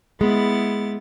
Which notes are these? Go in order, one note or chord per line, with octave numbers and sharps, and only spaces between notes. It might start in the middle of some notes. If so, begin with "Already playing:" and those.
G#3 B3 E4 A6